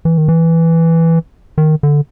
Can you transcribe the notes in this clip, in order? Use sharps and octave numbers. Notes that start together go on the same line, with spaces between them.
E3
D#3
E3
D#3
D3